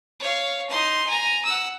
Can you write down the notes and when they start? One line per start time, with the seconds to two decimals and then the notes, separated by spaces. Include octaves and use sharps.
0.20 C#5 F5
0.69 D#4 C6
1.07 G#5 A#5
1.45 F#5 E6